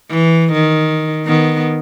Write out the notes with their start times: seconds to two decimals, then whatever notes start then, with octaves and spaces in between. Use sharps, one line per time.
0.10 E3
0.52 D#3
1.26 D#3 B3